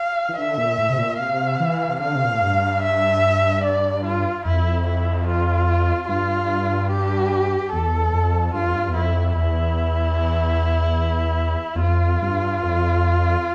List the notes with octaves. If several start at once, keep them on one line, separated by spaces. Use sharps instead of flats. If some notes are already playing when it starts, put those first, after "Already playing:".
Already playing: F5
E3
D3 E5
A#2
A2
C3
A#2
C3 F5
E3
C3
D3 F5
C3
A#2
A2
G2
E5
D5
F4
F2 E4
E4
F4
G2 F4
G4
E2 A4
F2
G2 F4
F2
G2
E2
F2 E4
E2 E4
E2
F2 F4
G2
F2